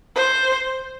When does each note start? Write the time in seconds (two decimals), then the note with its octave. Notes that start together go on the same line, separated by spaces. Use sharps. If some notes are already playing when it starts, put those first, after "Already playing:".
0.15 C5